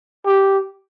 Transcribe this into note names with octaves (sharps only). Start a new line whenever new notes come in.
G4